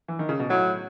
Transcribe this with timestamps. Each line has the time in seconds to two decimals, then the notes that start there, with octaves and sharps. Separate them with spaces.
0.08 E3
0.19 D#3
0.29 C#3
0.39 B2
0.50 A2 F#3